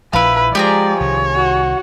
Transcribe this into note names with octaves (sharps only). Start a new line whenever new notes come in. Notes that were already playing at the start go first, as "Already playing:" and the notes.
A#1 F3 E4 B4 F5
F3 G#3 G4 G#4 D5 A#5
C2 D#3 C#5
F#4